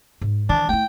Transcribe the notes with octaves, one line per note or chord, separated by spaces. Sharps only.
G#2
D#3 E3 D4
A3 E4 G5